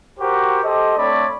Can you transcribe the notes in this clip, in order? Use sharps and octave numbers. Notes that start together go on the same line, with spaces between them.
F#4 G4 A#4 C5
G4 A4 C5 D#5
A3 C4 D4 C#5 D5 B5